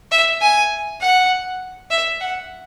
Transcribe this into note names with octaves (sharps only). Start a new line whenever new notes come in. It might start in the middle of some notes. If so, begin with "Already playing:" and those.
E5
G#5
F#5
E5
F#5